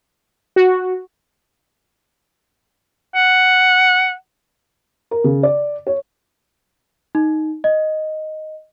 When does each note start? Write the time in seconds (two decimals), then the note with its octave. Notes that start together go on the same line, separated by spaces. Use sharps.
0.56 F#4
3.15 F#5
5.11 A#4
5.24 C#3
5.43 D5
5.87 C#5
7.15 D#4
7.64 D#5